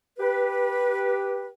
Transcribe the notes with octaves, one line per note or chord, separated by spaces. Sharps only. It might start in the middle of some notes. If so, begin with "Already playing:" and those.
G4 B4